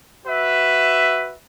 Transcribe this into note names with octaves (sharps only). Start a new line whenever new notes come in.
F#4 B4 E5